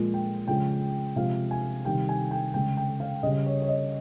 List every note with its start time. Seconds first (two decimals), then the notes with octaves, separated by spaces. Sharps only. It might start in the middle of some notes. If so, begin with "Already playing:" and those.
Already playing: A#2 F3 G#3
0.14 G5
0.48 C#3 F3 G#3 G5
1.16 C3 F3 G#3 F5
1.51 G#5
1.85 C3 D#3 G3 G5
2.09 G#5
2.31 G5
2.54 C#3 G#3 G5
2.77 G5
3.00 F5
3.23 C#3 G3 D#5
3.46 C#5
3.62 C#5
3.69 D#5